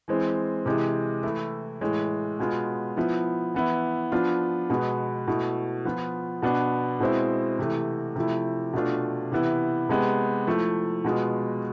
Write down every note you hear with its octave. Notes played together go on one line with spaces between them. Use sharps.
E3 G#3 C4
C3 E3 G#3
E3 A3 E4
A2 E3 G#3
B2 G#3 B3 F4
F3 B3 E4
E3 B3 E4
F3 B3 D4 F4
B2 G#3 B3
B2 A3 E4
F3 B3 F4
B2 B3 D4
B2 G#3 C4 E4
C3 E3 A3
C3 F3 A3 E4
B2 A3 D4 F4
C3 E3 B3 E4
C3 G#3 B3
F3 A3 E4
B2 G#3 B3 F4